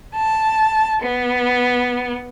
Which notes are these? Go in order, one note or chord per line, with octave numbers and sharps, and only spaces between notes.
A5
B3